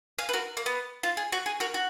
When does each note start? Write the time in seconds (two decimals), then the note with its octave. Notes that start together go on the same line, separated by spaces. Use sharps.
0.19 F5 G#5
0.29 B4
0.33 F#4 A#4
0.57 A#3
0.66 B3
1.03 F4
1.17 G#4
1.32 F#4
1.46 G#4
1.60 F#4 A#4
1.74 F#4